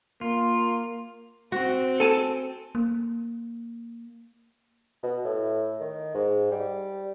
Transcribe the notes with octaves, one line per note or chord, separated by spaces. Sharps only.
A#3 F4
C4 F#4
A4 G#5 A5
A#3
B2
A2
D#3
G#2
G3